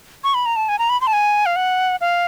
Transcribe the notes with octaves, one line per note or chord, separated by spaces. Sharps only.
C#6
B5
A#5
A5
G#5
A#5
B5
C6
A5
G#5
F5
F#5
F5